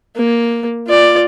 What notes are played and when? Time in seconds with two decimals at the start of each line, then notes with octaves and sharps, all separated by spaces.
0.16 A#3
0.87 F4 D5